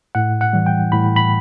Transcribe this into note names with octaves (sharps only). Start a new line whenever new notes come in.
A2 F#5
F#5
E3 G3
G5
A2 B5
B5